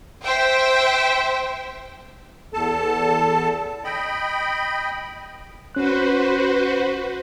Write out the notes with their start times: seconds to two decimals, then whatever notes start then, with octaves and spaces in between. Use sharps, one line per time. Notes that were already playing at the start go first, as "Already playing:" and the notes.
0.24 C5 E5 G5
2.54 E2 A4 A5
3.84 D#5 G5 B5
5.75 C#4 F#4 B4 C5 F#6